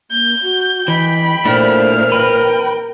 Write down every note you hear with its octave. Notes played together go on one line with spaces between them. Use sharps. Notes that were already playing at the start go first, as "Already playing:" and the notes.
A#3 G6
F#4
E3 D#5 G5 B5
A#2 A3 D4 E4 C5 F6
A#4 B4 G5